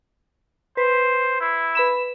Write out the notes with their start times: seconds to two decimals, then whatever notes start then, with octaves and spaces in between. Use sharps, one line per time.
0.77 B4 C5
1.40 E4
1.75 B4 B5 E7